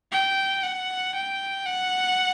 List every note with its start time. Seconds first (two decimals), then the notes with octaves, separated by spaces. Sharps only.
0.11 G5
0.64 F#5
1.15 G5
1.66 F#5